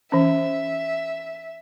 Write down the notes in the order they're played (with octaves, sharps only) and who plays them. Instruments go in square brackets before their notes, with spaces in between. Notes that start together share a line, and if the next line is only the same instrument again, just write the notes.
[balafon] E3 C#4 [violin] E5